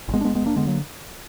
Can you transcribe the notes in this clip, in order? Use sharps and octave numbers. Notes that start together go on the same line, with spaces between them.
G#1
G#3 B3
D4
F1 G#3 B3
G#3 B3
F1
A#3 D4
D3 G#3 B3
F#3 A#3